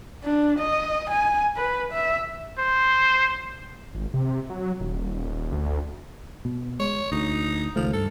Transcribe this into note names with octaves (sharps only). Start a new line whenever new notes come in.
D4
D#5
G#5
B4
E5
C5
G#1
C3
F#3
D#1
D2
B2
G#3 C#5
D2 D#4
C#2 D#3 F3 A3
G2 A4